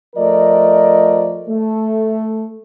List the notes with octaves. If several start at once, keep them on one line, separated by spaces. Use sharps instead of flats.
F3 A3 A#4 D5 D#5
A3